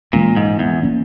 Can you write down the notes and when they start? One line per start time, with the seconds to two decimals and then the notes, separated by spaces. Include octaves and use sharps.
0.13 A#2 E3 G#3 C#4
0.36 G#2
0.59 E2
0.83 E3 A#3 C#4